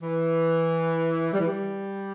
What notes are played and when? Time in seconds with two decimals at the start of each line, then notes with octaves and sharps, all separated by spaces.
0.01 E3
1.32 G3
1.40 E3
1.47 G3